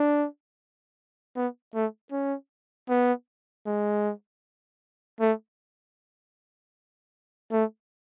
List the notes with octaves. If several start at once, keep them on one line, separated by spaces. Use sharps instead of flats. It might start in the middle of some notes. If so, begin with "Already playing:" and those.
Already playing: D4
B3
A3
C#4
B3
G#3
A3
A3